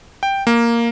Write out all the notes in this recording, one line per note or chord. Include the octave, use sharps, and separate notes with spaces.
G5
A#3